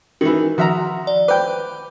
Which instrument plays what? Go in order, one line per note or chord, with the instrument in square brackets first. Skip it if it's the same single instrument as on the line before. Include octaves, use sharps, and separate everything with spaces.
[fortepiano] D#3 E3 [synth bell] F#4
[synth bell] D#3 F3 [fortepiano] F#4 E5 A#5
[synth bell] D5
[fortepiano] B4 G5 [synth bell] C5 D6